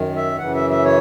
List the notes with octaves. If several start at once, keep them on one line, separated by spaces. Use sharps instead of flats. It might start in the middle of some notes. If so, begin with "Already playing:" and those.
Already playing: F#2 D#3
E5
F#2 C#3 E3 F#5
E5
E5
C#5